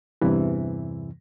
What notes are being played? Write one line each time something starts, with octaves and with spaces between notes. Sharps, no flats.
E2 G2 C3 E3